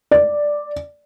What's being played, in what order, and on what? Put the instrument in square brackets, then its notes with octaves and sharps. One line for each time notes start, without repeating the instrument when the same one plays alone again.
[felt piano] D5